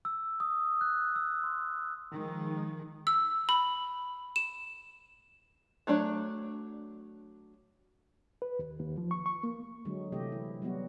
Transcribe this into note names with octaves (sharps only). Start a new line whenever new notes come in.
E6
D#6
F#6
E6
C6
D#3 F3 G#3
E6
B5
E7
F#3 A3 D4 C#5
B4
D#2
D#2
F3
C#6
C#6
A#3
D3 F#3 G#3
C3 E3 A3 G4 D#5
E4
F#3 G3 B3 F#4